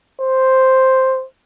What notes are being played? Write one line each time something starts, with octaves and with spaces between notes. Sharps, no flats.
C5